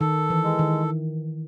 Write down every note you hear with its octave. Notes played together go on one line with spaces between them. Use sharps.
D#3 A4
E3
G#3
D#3